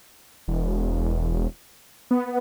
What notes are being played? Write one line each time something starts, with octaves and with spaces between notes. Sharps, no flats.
E1
B3